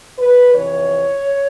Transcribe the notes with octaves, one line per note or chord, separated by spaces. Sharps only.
B4
F2 C3 E3 C#5